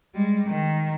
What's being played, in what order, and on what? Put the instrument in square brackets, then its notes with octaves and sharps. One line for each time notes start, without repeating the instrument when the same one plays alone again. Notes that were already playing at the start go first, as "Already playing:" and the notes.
[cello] G3 G#3
D#3